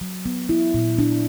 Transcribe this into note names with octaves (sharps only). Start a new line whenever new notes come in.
F#3
B3
E4
A#2
D4